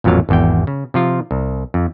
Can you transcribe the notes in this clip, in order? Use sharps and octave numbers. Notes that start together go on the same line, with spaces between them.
A1 F2 A#2 F#3 F5
G#1 E2 G5
C#3
C3 F3 F4
C2
F2